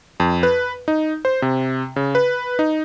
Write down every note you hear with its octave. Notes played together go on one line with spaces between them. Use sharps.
F2
B4
D#4
C5
C3
C#3
B4
D#4